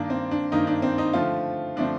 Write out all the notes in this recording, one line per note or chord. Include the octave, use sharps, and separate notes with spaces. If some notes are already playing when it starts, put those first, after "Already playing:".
Already playing: G2 D#3 A#3 D4
C4
D4
G2 D#3 A#3 D#4
D4
C4
D#4
D3 F3 A3 C4 F4
D3 F3 A3 C4 D4